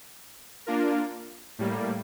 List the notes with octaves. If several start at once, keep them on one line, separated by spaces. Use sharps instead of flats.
A#3 D4 F4 A#4
A2 G3 A#3